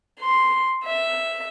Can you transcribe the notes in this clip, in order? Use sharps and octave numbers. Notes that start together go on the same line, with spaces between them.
C6
E5